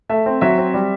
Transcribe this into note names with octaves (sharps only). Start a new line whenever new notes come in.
A3 E5
C4
F#3 E5
C4
G3